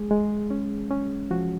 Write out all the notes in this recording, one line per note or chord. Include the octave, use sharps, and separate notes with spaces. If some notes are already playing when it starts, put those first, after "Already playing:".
Already playing: G#3 G#4
G#3
C#4
C#4
F3 F#4